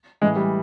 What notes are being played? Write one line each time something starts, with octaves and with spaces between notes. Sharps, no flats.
A2 E3 G#3
G3